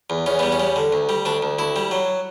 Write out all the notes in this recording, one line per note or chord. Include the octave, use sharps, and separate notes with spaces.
E2
E2 C#4
G3 B3
C#4
G3
D3
D2
G3
D2 D4
D2
D2 E4
G3
F#3